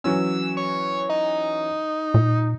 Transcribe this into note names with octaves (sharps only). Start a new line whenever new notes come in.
E3 F#3 C#4 E6
C#5
D#4
A#2